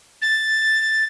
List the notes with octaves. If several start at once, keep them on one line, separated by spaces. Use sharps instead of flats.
A6